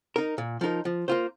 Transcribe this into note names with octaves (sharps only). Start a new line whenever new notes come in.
D#4 A#4
A#2
F3 D#4 A#4
F3
A#3 F4 C5